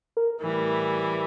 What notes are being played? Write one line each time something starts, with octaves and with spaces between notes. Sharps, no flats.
A#4
A2 E3 G3